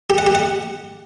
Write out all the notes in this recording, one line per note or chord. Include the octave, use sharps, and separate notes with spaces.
G4
F#5
G4
F#5